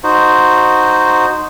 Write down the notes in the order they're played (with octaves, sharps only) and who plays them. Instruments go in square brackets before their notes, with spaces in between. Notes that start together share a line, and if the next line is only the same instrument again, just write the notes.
[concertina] D#4 F#4 C5